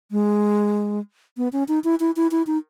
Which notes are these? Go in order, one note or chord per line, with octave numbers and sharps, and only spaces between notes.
G#3
B3
C#4
D#4
E4
E4
E4
E4
D#4